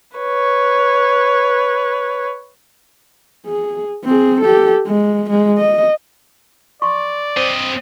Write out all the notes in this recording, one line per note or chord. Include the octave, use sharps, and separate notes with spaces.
B4 C#5
G#4
C4 G#4
G4 A4
G#3
G#3
D#5
D5 C6 C#6
C4 C5 D#5